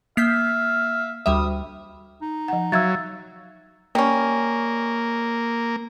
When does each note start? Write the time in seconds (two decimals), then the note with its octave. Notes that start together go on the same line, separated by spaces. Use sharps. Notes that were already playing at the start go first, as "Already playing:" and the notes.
0.17 A#3 E5 F5 G6 B6 C7
1.26 D2 G3 E5 D#6
2.22 D#4
2.48 F3 F#5
2.72 F#3 E5 F5 E6 G#6 A6
3.95 G3 A#3 C#4